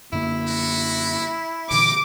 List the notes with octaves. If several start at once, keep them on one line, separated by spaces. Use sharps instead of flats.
F#2 D3 A#3 E4
F#4
A#2 D3 E3 D#4 D6